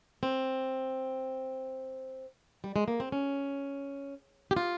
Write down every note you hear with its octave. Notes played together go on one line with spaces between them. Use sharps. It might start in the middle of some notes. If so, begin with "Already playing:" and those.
C4
G3
G#3
A#3
C4
C#4
G4
F4